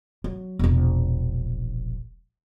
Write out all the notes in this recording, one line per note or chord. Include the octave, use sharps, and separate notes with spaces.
F#3
E1 A#1